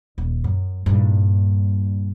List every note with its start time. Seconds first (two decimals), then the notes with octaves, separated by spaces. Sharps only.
0.18 D#1
0.44 F#2
0.86 G2 A#2